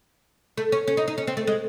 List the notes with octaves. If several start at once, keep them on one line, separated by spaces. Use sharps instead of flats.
A3
C#4
C#4
D#4
D#4
C#4
C4
A3
G#3